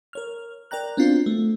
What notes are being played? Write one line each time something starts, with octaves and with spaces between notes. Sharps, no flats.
A#4 C#5 F6
A#4 D5 G5 A#5 F#6
B3 C4 D4 F4 F#4 C5
A3